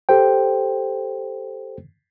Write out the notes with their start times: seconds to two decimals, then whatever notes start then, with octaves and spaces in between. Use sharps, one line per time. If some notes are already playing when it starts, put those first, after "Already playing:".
0.09 G4 A4 C5 G5